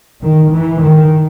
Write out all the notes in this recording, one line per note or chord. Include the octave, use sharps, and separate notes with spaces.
D#3
E3
D#3